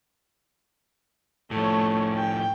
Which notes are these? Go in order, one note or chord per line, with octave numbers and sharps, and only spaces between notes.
A2 F3 A3 C#5
G5